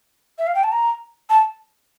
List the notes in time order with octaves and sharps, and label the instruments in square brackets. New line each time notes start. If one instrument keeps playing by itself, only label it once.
[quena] E5
F5
G5
A5
A#5
A5